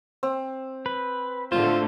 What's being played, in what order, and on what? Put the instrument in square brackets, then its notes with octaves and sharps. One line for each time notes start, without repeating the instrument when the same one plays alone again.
[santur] C4
[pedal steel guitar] B4
[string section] A2 D3 A3 [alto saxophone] F4 [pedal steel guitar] C5